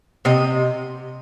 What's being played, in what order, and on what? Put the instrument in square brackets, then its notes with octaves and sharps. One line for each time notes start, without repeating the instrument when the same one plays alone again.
[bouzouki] C3 D#5